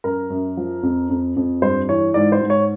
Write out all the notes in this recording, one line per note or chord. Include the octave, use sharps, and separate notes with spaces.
F#2 A#4
F#2
F3
F2
F2
F2
G2 C5
E3 C#5
G#2 D5
C5
G#2
C#5